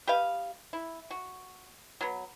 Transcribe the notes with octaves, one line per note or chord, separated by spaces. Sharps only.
G4 B4 D#5 F5
E4
F#4
F#3 B3